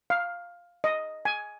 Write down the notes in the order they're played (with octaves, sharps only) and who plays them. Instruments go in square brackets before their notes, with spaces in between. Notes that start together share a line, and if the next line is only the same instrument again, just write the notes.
[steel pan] F5
D#5
G#5